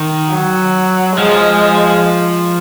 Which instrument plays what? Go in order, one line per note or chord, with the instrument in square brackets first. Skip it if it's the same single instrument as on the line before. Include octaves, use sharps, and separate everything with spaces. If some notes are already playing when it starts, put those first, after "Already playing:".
Already playing: [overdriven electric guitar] D#3
[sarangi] F#3
[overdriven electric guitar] F3 [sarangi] G#3